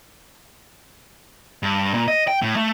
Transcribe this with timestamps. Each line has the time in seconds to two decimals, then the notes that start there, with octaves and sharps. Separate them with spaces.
1.63 G2
1.94 A#2
2.08 D#5
2.28 G5
2.42 A2
2.56 A3